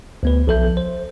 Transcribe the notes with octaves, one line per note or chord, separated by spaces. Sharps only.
D2 B3 B4
B1 F3 A4 E5 G6
C5